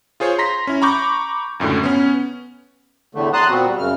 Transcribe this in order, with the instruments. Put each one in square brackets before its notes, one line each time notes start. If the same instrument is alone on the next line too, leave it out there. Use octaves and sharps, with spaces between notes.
[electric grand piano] F4 G#4 C5 C#5
A#5 C6 A#6 B6
C#4 E4
A#5 B5 C#6 D6 G6
C#2 F#2 A2 D3
B3 C#4
[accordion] E2 A2 D3 A3
A5 A#5 C6 D#6 F#6
A#2 B3 C4 F#4
G3
F#2 C#3 F6